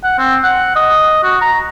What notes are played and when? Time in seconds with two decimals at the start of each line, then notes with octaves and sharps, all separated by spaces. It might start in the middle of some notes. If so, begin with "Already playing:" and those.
0.04 F#5
0.18 C4
0.44 F#5
0.76 D#5
1.23 F#4
1.42 A#5